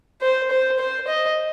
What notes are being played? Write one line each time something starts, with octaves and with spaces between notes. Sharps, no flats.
C5
C5
C5
D#5